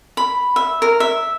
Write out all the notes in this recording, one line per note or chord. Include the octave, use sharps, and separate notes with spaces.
B5
E5
A#4
E5